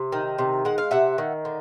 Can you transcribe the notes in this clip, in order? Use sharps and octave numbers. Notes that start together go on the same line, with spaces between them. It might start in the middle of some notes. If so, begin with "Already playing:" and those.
Already playing: C3
D#3
C3
G#3 F#5
F5
C3 E5 F#5
D#3
D3